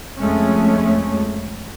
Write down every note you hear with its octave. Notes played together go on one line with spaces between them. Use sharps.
F2 G#3 A3 C#4